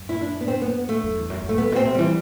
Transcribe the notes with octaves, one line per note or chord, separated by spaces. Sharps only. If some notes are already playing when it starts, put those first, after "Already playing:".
Already playing: F#2
E4
D4
B3
C4
B3
A3
F#2
E2
F#2
F#2
A3
G2 B3
B2 C4
C3
E3 G3